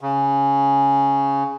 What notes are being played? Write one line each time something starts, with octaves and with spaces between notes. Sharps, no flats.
C#3